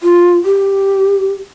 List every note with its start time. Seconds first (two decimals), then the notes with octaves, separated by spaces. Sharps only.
0.03 F4
0.45 G4